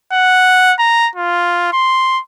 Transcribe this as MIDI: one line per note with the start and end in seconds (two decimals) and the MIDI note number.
0.13 0.74 78
0.79 1.09 82
1.16 1.72 65
1.73 2.20 84